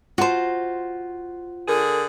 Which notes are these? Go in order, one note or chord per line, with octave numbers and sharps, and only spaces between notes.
F4 F#4 C5 A5
D3 G#4 A#4